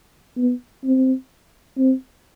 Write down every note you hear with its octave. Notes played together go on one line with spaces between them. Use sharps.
B3
C4
C4